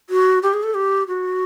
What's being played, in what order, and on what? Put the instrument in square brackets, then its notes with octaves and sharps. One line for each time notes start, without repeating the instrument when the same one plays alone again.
[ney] F#4
G4
G#4
A4
G4
F#4